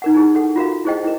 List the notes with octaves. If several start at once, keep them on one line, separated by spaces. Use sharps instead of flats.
D#4 A#4 F#5
D#4 E4 G#4
A4 F#5
F4 F#4 A#4 F5
E4 G#4 C5 D#5 G5
E4 A#4